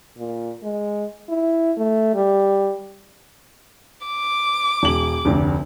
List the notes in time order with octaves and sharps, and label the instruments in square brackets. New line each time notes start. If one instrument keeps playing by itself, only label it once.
[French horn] A#2
G#3
E4
A3
G3
[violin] D6
[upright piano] E1 F#7
F1 D2